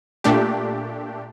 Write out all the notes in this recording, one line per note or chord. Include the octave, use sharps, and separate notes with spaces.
A#2 A3 D4 G4